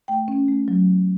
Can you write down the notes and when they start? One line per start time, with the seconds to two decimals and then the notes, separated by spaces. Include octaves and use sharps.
0.08 A3 G5
0.28 C#4
0.48 A3
0.68 F#3